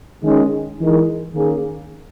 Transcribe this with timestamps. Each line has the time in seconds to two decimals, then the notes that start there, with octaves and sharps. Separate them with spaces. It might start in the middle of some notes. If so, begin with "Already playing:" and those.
0.22 D#3 G#3 C#4
0.79 E3 G#3 D#4 A#4
1.34 D#3 A#3 C#4 G#4